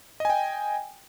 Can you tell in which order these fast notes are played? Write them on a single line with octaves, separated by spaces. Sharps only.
D#5 G#5 G5